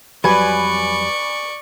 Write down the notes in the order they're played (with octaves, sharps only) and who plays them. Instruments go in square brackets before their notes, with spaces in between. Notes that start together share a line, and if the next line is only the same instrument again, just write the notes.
[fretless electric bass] F2 F#3 G3 [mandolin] B4 G#5 [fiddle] D5 C#6